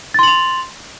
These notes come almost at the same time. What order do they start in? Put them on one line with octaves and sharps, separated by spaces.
A6 C6 F#7 F7